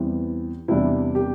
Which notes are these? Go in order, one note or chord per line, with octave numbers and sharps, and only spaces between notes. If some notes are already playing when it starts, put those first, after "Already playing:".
Already playing: E2 E3 G3 C4
E2 C3 G3 D4 E4
G4